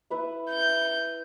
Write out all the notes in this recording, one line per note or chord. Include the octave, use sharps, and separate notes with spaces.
E4 B4 E5
G6